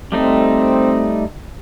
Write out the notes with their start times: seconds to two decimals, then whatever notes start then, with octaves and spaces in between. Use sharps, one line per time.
0.12 G3 A3 C4 D#4